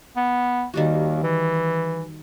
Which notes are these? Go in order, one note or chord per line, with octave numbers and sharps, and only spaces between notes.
B3
D#2 D#3 G3 F#4
E3